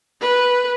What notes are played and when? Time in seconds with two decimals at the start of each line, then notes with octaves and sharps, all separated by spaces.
0.21 B4